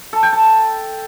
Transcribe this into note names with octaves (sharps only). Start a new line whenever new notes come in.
A4
G5
A5